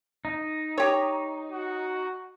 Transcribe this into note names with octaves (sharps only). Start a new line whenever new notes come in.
D#4
G4 C#5
F#4